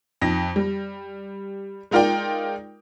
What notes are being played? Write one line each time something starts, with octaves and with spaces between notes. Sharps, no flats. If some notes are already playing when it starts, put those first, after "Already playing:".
F2 D#4 A#6
G3
G#3 D#4 F4 A#4 D5 G5